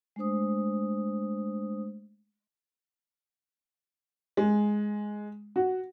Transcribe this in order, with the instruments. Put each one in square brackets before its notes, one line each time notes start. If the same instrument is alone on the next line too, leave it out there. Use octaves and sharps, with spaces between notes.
[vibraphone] G#3 A3 D4 C5 D#6
[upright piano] G#3
F#4